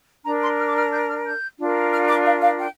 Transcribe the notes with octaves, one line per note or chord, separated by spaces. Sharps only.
D4 A#4 A#5
C6
F6
D6
F6
G6
F6
G6
D4 F4 A#4
F6
D6
F5
F5
G5